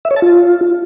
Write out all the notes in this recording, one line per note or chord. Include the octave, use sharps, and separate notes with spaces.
E5
C#5
A5
F4